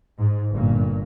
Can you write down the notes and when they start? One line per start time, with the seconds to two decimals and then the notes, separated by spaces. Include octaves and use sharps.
0.19 G#2
0.51 G1 A#2